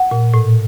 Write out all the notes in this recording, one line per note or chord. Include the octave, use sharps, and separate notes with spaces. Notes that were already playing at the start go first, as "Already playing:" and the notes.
Already playing: F#5
A#2
A2